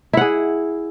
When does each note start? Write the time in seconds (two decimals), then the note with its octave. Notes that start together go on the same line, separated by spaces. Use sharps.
0.13 E4
0.17 F#5
0.21 G#4